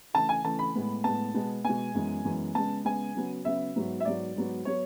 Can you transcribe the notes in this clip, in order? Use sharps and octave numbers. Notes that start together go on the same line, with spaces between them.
C#3 E3 A3 A5
G#5
C#3 E3 A3 A5
B5
A2 G#3 B3
A2 G#3 B3 A5
B2 G#3 B3
B2 G#3 B3 G#5
F#2 E3 G#3 B3
F#2 E3 G#3 B3
C#3 G#3 B3 A5
C#3 G#3 B3 G#5
C#3 F#3 B3
C#3 F#3 B3 E5
G#2 F#3 B3
E5
G#2 F#3 B3 D5
G#2 F#3 B3
F#3 B3 C#5